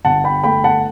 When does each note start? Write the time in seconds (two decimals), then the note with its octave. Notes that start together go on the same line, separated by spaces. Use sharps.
0.05 G1 F#5 A5
0.24 G5 B5
0.43 A3 G5 B5
0.64 F#5 A5